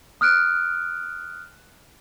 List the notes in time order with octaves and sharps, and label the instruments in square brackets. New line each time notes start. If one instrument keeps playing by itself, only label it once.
[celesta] D#6 F6 F#6 D7